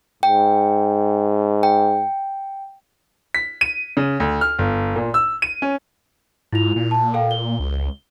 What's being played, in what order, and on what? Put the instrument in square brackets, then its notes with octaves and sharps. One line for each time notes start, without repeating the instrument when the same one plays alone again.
[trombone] G#2 [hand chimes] G5
[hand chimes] G5
[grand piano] B6
D#7
C#3
D2
F6
G1
A#2
E6
D#7
C#4
[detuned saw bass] G#2 [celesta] E4 F4 F7
[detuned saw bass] A#2
[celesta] A5
A4 F5 G5
G7
[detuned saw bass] C#2